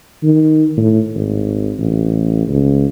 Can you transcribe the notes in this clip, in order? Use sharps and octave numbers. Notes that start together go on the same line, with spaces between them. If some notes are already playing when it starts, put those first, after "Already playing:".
D#3
A2
G#1
A1
C#2